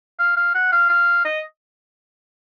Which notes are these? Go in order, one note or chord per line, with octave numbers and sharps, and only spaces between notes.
F5
F5
F#5
F5
F5
D#5